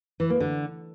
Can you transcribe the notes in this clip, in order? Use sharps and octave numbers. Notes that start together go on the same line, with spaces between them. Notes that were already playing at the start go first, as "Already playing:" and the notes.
E3
A#3
D3